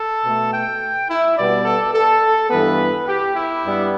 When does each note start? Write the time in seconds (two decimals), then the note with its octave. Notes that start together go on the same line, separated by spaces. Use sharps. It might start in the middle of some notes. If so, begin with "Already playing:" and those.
Already playing: A4
0.24 B2 A3
0.53 G5
1.09 E4
1.37 B2 G3 B3 D5
1.65 A4
1.94 A4
2.50 G2 E3 B3 B4
3.07 G4
3.35 E4
3.63 G2 G3 B3